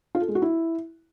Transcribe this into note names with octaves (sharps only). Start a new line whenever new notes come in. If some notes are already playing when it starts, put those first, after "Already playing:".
F4
A4
G#3
F#4
E4